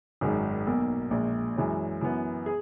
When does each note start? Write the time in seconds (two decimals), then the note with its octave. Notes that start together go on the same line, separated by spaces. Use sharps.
0.21 G#1 F#2 D#3 G#3
0.66 B1 B2 A#3
1.11 A#1 A#2 G#3
1.56 F#2 E3 G#3 C#4
2.01 F#2 E3 B3
2.46 G#4